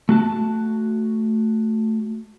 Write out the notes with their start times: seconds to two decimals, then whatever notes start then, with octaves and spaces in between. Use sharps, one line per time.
0.09 A3 F#4 A5